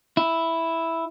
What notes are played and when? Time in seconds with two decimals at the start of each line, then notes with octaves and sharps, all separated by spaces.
0.17 E4